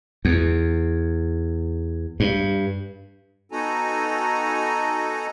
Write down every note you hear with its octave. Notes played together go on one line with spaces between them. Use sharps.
E2
G2
B3 D#4 F#4 A4 G#5 A#5